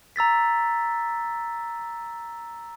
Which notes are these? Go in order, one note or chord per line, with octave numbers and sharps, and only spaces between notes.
A#5 E6 A6 B6